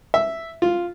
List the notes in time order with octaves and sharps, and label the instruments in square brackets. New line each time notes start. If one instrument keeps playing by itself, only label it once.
[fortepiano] E5
F4